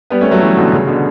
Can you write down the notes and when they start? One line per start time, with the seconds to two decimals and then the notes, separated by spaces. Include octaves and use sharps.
0.10 G3 B3
0.21 A3 C#4
0.31 F#3 A3
0.41 E3 G3
0.56 B2 D3
0.72 C#3
0.87 B2 D3